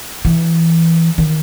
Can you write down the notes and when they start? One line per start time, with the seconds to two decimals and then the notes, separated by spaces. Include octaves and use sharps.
0.25 E3
1.18 D#3